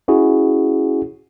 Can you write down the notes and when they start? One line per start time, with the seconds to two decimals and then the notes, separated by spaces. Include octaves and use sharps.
0.08 C#4 E4 F#4 G#4